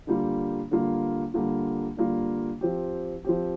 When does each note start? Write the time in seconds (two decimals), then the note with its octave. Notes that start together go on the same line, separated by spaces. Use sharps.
0.07 D3 G3 A#3 F4
0.71 D3 G3 A#3 F4
1.34 D3 G3 A#3 F4
1.97 D3 G3 A#3 F4
2.61 F3 C4 G4
3.25 F3 C4 G4